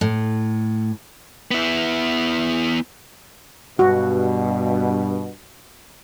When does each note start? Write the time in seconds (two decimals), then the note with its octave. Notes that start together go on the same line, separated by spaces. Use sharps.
0.01 A2
1.51 B3 E4
3.79 G2 B2 F#4